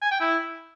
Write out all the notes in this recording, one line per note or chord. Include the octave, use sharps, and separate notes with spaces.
G#5
G5
E4